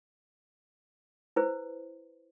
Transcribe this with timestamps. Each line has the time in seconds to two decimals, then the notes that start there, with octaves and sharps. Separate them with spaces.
1.36 E4 B4 C5